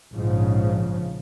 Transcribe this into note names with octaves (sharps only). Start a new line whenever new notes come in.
A#1 G#2 C#3 F3